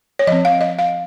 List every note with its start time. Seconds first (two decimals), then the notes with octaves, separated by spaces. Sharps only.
0.19 C#5
0.27 F3 C4 D#5
0.45 F5
0.61 D#5
0.79 F5